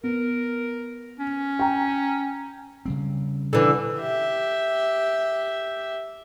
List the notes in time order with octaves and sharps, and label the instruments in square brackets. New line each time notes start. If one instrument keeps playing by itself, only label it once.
[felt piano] B3 [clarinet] A#4
[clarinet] C#4
[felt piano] G5 A#5
[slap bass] C#3 G3 C4
[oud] D3 E3
[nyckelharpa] G4 E5